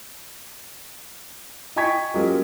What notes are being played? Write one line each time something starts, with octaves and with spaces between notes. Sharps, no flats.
D#5 G5 G#5 C#6 G#6 B6
F#3 G#3 A#3 C#4 F4 G4